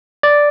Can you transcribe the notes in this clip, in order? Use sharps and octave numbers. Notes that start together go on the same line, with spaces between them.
D5